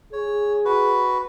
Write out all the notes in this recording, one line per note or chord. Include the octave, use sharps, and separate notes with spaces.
G#4 C#5
F#4 B4